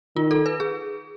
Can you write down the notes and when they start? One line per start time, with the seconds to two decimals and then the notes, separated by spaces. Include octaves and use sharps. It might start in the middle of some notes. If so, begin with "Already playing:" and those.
0.16 D#3 F4
0.31 A4
0.46 B4
0.60 G#4